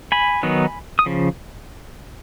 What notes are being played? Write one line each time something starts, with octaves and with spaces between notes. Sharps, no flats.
G#5 B5
D#3 F#3 B3 D#4
D#6
C#3 F3